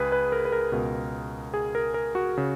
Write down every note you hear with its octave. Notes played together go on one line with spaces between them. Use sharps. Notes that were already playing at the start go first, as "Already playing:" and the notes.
Already playing: C#2 G#4 B4
B4
A#4
B4
A#4
C#2 B2
G#4
A#4
A#4
F#4
C#3